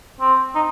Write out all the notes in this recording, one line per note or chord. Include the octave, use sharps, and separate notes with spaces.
C4
D#4